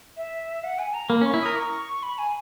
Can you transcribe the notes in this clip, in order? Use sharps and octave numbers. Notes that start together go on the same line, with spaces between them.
E5
F#5
G#5
A#5
A#3 B5
C#4 C#6
E4
A#4 D#6
C#6
B5
G#5